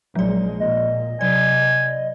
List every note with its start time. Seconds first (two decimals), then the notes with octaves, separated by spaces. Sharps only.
0.15 A#1 F3 F#3 G#3 D5
0.60 A#2 D#5
1.21 C3 F#3 D5 G#5